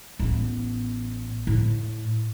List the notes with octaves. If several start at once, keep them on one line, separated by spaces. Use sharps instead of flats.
A1 B3
A2